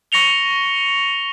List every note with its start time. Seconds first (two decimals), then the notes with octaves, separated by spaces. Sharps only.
0.12 C#6 A#6 C#7 F7 G7